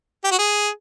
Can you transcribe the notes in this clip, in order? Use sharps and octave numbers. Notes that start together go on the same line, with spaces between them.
G4
F#4
G#4